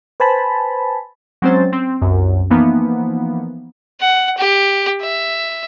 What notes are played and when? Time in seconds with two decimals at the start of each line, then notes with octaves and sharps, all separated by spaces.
0.20 B4 C5 G#5 A5 B5
1.42 F#3 G#3 C4 C#4 C5 A6
1.73 C4
2.02 C2 F#2
2.50 E3 F3 A#3 B3 D#4
4.01 F#5
4.38 G4
5.01 E5